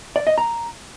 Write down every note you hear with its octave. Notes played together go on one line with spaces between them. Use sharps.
D5
D#5
A#5